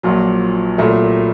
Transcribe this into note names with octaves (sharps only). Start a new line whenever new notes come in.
A#1 A#2 F#3
C2 A#2 F#3 A3